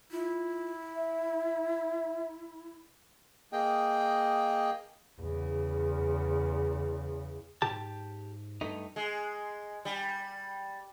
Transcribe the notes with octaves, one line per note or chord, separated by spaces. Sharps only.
E4 F4
E5
A#3 G#4 D#5 G5
E2 C#3
G#2 G4 A5
G2 A3 D#4
G#3
G3